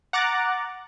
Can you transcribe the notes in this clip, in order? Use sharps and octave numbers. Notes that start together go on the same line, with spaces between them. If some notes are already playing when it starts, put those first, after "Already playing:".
F#5 A#5 D6 F#6 A6